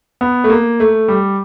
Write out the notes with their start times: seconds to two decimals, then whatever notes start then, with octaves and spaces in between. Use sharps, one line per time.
0.21 B3
0.44 A3
0.50 A#3
0.80 A3
1.08 G3